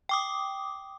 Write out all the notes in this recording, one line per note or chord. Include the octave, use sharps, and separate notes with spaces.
G5 D6 D#6